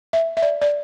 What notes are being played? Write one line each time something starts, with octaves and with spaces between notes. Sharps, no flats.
E5
E5
D5
D5